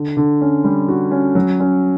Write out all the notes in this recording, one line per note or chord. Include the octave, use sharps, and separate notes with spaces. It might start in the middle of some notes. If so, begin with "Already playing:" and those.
Already playing: D3
D3
C#4
G3
F#4
C#4
F#3
C#4